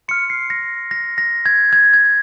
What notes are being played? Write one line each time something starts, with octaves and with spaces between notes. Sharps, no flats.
C6 F6 C#7
C7
A#6
A#6
A#6
G#6
G#6
G#6